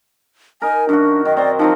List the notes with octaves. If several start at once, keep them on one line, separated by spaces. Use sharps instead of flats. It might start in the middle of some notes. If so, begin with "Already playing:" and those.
D#4 A#4 G#5
F#2 D4 F#4
D#3 D#5
C4 C5 D5
F3 F#3 C4 D#4